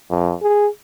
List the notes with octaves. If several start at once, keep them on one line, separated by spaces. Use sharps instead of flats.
F2
G#4